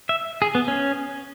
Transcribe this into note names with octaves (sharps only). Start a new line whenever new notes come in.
E5
G#4
B3
C#4